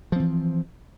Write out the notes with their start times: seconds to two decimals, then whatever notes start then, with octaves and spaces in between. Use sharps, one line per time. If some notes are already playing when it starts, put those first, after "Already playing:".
0.12 F3
0.16 C4
0.20 E3